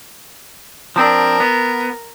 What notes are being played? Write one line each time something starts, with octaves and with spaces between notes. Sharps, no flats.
F3 C4 D4 A#4
B3